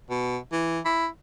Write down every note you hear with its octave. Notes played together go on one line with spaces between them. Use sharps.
B2
E3
E4